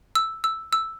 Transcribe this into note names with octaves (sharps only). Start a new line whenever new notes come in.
E6
E6
E6